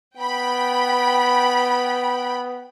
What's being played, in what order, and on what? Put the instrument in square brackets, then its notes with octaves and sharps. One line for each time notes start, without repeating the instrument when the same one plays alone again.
[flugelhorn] B3 [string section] G5 B5